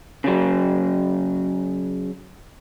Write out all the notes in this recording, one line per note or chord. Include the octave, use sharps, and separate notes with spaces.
C#3 F#3